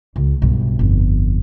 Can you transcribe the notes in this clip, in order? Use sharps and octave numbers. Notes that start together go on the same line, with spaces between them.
C#2
B1 G2
G1 F2